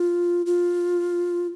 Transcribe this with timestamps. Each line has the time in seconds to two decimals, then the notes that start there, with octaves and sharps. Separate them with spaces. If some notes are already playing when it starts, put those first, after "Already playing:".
Already playing: F4
0.46 F4